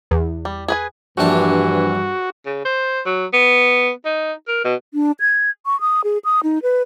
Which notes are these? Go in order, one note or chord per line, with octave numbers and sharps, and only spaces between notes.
E2
G3
G#4 B4 G#5
A#1 G2 C3 E3 D4 F#4
C#3
C5
F#3
B3
D#4
A#4
B2
D4
G#6
C#6
D#6
G#4
D#6
D#4
B4